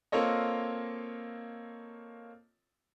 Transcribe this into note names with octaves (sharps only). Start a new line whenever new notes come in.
A#3 C4 F4 A4 C#5 D#5